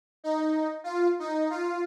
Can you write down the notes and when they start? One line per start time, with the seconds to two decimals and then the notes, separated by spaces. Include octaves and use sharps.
0.24 D#4
0.84 F4
1.19 D#4
1.50 F4